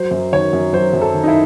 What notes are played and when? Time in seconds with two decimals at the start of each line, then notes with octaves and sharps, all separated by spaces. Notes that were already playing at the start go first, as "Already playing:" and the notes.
Already playing: F#3 C5
0.11 F#2
0.32 D#3 C#5
0.53 F#2
0.73 F#3 C5
0.93 F#2
1.01 A4
1.14 D#3
1.24 D#4
1.28 E4